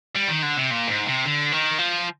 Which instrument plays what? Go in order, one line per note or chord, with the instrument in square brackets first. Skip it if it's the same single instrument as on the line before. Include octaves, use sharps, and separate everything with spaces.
[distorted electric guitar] G3
D#3
D3
C3
A#2
G#2
C3
D3
D#3
F3